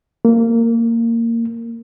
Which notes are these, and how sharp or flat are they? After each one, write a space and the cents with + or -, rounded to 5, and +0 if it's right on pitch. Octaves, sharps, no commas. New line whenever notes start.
A#3 -15